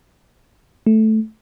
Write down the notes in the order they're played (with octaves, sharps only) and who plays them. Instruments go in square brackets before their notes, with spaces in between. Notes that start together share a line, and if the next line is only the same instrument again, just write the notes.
[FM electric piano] A3